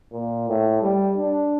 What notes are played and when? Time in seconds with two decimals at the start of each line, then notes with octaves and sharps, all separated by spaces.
0.12 A#2
0.49 A2
0.81 G3
1.18 D4